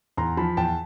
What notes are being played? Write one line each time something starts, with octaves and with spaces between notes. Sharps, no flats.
E2 A#5 C6
F3 A5 B5
E2 G5 A5